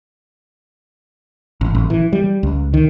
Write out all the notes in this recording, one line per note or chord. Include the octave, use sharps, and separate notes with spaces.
A1
A1
E3
G3
C#2
D#3